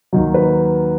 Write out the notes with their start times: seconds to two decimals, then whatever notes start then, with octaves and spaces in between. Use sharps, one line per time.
0.13 D#2 D#3 F#3
0.34 B4